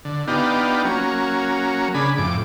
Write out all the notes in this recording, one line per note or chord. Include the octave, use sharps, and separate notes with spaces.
D3
B3 D4 D#4 F4 G4
F#3 A#3 C#4
C#3 D4 G#4 B5
F2 A2 D6